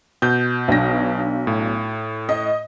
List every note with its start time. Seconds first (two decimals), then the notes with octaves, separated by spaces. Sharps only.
0.22 B2 G6
0.68 B1 D4 A#6
1.47 A2
2.29 D#5